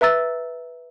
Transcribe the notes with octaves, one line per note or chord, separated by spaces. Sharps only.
B4 E5 A#5 E6 A6